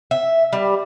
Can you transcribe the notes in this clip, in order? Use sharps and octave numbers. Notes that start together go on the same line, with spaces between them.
E5
G3